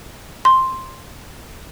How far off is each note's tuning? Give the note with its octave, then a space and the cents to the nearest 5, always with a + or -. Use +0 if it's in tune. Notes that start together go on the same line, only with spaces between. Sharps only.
C6 +5